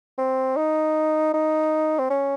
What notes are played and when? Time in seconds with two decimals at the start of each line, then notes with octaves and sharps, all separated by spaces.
0.18 C4
0.56 D#4
1.34 D#4
1.99 C4
2.10 C#4